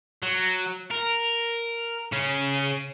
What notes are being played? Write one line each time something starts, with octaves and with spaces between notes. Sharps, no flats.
F#3
A#4
C#3 C#4